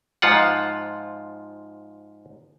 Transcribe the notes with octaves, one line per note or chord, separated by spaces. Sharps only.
G#2 F3 F4 F#5